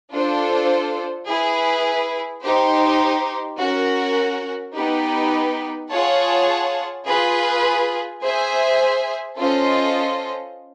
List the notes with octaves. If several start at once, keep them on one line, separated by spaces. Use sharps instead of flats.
D4 F4 A4 C5
E4 G#4 B4
D#4 G4 C5
C#4 F#4 A#4
B3 D#4 G4 B4
F4 G#4 C#5 F#5 A5
F4 G#4 B4
G#4 C5 E5 G#5
C#4 F4 A4 C5 D#5